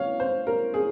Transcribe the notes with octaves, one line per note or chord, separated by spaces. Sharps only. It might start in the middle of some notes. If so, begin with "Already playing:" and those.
Already playing: C#5 F5
C5
A#4
G#4